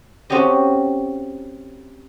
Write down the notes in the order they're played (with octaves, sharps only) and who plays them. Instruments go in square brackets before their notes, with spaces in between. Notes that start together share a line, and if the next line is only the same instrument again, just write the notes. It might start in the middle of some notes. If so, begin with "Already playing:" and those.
[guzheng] A3 C4 C#4 F#4 G4 D#5